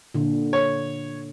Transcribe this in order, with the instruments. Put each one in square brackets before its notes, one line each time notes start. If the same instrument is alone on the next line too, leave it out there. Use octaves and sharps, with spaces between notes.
[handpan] A#2 D3
[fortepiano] C#5